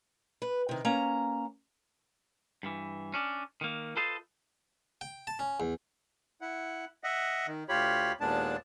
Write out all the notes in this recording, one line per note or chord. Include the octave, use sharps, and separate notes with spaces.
B4
C3 D#3
A#3 C#4 A#5
G2 E3
C#4 D4
D#3 A#3
F4 A4 B4 C5 D#5 A5
G5
A5
C#4
E2
E4 F#5
D#5 E5 F#5
D#3
D2 F4 G4 C#5 B5
D#2 A#2 G#3 B3 D4 A5